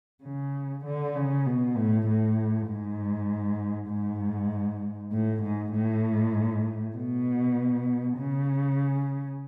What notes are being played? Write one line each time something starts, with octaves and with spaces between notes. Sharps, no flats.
C#3
D3
C#3
B2
A2
A2
G#2
G#2
A2
G#2
A2
B2
C#3